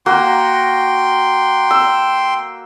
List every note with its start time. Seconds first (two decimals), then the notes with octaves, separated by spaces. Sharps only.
0.06 A#3 F#4 A#4 G5 C6
1.71 E6